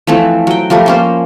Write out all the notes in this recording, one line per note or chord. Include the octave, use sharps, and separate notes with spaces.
E3 F3 A3 C4
F#3 G5
F3 G3 A3 A#4
A#3 C#4 C5